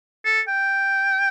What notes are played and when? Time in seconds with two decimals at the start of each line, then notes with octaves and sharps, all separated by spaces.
0.25 A4
0.48 G5